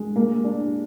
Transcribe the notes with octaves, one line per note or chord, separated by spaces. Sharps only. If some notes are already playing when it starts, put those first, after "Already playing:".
Already playing: G#3
A#3
D4